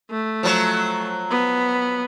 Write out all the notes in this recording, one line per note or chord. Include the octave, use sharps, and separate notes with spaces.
A3
F3 F#3
B3